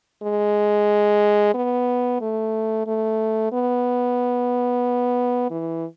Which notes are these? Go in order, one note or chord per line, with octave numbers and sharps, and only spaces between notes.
G#3
B3
A3
A3
B3
E3